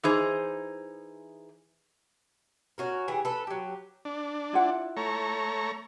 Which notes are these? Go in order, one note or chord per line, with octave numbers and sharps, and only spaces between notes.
E3 D#4 G#4 C5
C#4 F#4 A#4
E3 G4 G#4
A4 B4
F#3 G4
D4
E4 F4 F#5
A3 C#5 A#5